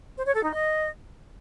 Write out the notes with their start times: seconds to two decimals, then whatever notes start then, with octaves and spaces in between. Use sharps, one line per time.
0.16 C5
0.25 C#5
0.34 A4
0.43 D#4
0.52 D#5